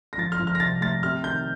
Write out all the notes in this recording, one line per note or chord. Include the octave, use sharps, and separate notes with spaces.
A#6
F3 A6
F6
F3
F6
A#6
C2 A6
A3 A6
C3 F6
D#3 G6